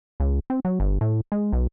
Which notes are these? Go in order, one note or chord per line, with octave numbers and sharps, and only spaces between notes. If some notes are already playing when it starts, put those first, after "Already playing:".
C#2
C4
F#3
G1
A2
G#3
B1